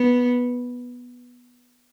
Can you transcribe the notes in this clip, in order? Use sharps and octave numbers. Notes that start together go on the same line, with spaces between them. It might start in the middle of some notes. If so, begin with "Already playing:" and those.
Already playing: B3